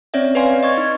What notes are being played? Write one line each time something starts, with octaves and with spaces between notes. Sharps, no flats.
C4 C#4 C#5 D5 E5
B4 C#5 D5 F5 G#5 C6
D#5 C#6 G#6
D#4